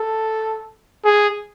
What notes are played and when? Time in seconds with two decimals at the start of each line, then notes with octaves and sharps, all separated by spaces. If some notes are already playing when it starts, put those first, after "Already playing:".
Already playing: A4
1.05 G#4